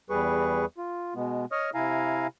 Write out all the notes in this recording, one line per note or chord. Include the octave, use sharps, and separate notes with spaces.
E2 G3 G#4 B4 C#6
F4
B2 G#3 B3
C#5 D#5 C#6 D#6 F6
C3 E4 F5 G#5 A#5